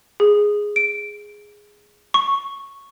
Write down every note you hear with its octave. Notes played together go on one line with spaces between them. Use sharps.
G#4
D7
C#6